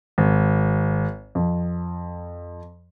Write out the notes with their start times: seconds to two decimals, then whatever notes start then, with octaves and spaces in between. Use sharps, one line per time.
0.18 G#1
1.35 F2